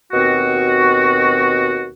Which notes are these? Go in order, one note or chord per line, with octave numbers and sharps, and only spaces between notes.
D#2 B2 C4 F#4